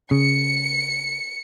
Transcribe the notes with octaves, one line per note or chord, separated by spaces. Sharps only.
C#3 C#7